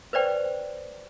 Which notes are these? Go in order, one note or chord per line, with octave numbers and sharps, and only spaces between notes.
B4 C5 D5 G5